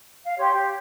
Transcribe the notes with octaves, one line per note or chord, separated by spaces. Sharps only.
F5
G4 C#5 C6
G4